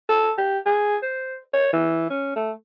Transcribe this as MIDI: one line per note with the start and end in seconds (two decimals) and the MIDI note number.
0.09 0.33 69
0.38 0.59 67
0.66 0.96 68
1.03 1.38 72
1.54 1.72 73
1.73 2.07 52
2.10 2.35 61
2.36 2.52 57